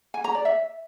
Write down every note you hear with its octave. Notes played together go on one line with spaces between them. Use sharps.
G#5
A#5
D5
E5